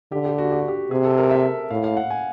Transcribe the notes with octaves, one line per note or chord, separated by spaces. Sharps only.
D3 G4
G4
F#4
G4
F#4
G4
C3 G#4
A4
A#4
E5
A2 F5
F5
F#5
G#5